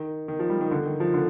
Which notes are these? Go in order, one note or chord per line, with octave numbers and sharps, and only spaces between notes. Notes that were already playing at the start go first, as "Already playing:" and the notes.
Already playing: D#3
D#3
F3
G3
D#3
D3
D#3
F3
D3